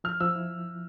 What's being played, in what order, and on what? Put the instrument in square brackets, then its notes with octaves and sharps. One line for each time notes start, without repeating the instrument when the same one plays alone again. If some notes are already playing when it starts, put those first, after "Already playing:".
[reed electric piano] F3 [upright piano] F6
[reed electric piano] F3 [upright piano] E6
[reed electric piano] E4